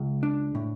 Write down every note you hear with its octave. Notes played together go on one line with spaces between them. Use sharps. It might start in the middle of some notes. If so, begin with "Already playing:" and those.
Already playing: C#2
D4
A2